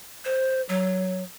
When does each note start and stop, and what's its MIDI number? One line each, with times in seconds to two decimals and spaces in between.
0.25 0.62 72
0.69 1.23 54